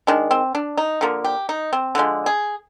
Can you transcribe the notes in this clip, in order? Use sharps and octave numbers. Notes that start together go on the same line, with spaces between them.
D#3 G#3 D4
C4
D4
D#4
D3 F3 A#3
G4
D#4
C4
D3 F3 G#3
G#4